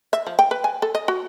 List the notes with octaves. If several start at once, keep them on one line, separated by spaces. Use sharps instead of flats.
E5
F3
G5
B4
G#5
A4
D#5
F#4